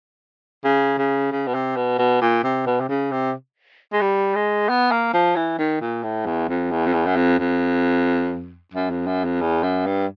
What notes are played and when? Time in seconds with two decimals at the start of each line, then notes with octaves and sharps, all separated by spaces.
0.64 C#3
0.98 C#3
1.31 C#3
1.47 B2
1.54 C3
1.76 B2
1.99 B2
2.21 A#2
2.44 C3
2.66 B2
2.80 C3
2.89 C#3
3.11 C3
3.93 G#3
4.01 G3
4.35 G#3
4.69 B3
4.91 A#3
5.13 F3
5.36 E3
5.58 D#3
5.81 A#2
6.03 A2
6.26 E2
6.49 F2
6.71 E2
6.86 F2
6.93 E2
7.06 F#2
7.16 F2
7.39 F2
8.73 F#2
8.90 F2
9.07 F#2
9.24 F2
9.41 E2
9.63 F#2
9.86 G2